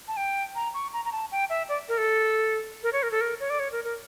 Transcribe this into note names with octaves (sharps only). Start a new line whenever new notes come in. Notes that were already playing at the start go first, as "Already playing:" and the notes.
A5
G5
A#5
C#6
A#5
A#5
A5
G5
E5
D5
A#4
A4
A#4
C#5
A#4
A4
A#4
C#5
D5
C#5
A#4
A#4